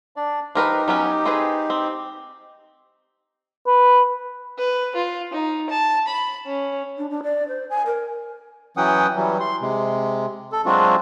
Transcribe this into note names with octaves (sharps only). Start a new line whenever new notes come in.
D4 D5
F3 D#4 G4 A#4 B4
F#3 B3 C#4
C4 G#4 B4
C4
B4
B4
F4
D#4
A5
B5
C#4
D4
D4
D5
C5
G#5
A#4
E3 F#3 C#4 F#5 G5 D#6
E3 F#3 G3
C6
C3 G#3
A4
F#3 G#3 C4 D4 F4 F#4